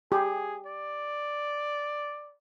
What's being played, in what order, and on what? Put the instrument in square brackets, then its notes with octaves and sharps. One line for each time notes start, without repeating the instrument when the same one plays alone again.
[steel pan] G4 [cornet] G#4
[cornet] D5